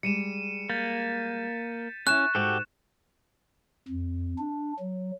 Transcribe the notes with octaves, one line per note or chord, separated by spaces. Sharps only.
G3 G#3 C#7 D#7 E7
A#3 G6 A6 B6
C#4 E4 G#5 C#6 F#6 E7
G#2 F#4 G4 A4
F2
D4
F#3